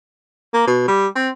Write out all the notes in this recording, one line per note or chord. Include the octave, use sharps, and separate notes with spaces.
A#3
B2
G3
C4